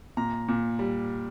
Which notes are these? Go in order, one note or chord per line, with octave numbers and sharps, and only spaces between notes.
A#2 A#5
A#2
G3